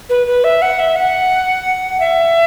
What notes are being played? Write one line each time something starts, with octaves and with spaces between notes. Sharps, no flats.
B4
B4
E5
F#5
E5
F#5
E5